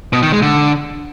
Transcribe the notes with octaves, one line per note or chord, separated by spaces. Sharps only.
B2
D#3
G#3
D3